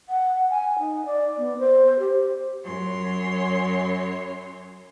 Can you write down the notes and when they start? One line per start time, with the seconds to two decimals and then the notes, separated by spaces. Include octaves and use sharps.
0.09 F#5
0.50 G#5
0.80 D#4
1.06 D5
1.38 B3
1.59 C5
1.99 G4
2.63 F#2 C#5 C6